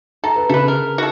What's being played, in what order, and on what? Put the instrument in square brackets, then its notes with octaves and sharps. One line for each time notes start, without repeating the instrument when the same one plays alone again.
[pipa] A4 [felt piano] A#5
[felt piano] B4 A#5
[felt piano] C#3 [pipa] A4 B4
[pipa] A#4
F#4 A4